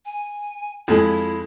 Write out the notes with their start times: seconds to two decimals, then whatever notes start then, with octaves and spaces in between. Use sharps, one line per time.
0.05 G#5
0.88 F2 G#3 E4 G#4